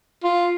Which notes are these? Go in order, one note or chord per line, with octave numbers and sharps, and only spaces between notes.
F4